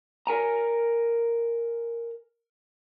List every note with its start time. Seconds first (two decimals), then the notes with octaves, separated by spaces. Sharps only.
0.27 A#4 G#5 A#5